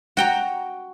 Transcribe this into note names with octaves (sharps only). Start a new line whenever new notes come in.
F#4 G5 A#5